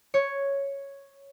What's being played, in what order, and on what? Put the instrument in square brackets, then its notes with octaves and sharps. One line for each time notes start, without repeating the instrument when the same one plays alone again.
[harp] C#5